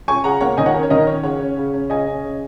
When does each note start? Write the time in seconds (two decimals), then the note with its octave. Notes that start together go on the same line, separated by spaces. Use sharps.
0.08 C#4 G#5 C#6
0.24 C#3 F#5 A#5
0.41 A#3 C#5 F#5
0.57 D#3 D#5 G#5
0.66 C#5 F#5
0.74 C#4 A#4
0.83 C#5
0.90 D#3 A#4 D#5
1.07 C#4 C#5
1.23 C#3 C#5 F#5
1.41 C#4
1.57 C#3
1.74 C#4
1.90 C#3 D#5 G#5
2.06 C#4
2.23 C#3